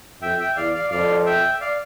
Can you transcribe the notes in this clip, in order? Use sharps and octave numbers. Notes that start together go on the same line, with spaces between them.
F2 E5 G5
E5 G5
E2 D5 F5
D5 F5
F2 D5 F5
E5 G5
D5 F5